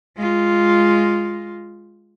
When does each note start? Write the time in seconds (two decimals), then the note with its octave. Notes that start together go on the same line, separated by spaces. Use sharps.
0.17 G#3 F4